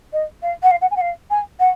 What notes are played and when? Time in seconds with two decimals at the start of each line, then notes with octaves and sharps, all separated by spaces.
0.13 D#5
0.42 F5
0.63 F#5
0.71 F5
0.81 F#5
0.91 G#5
0.96 F#5
1.01 F5
1.30 G#5
1.60 F#5